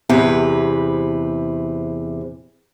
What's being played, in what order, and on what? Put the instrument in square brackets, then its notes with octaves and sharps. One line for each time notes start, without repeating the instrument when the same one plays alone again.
[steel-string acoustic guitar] E2 C3 B4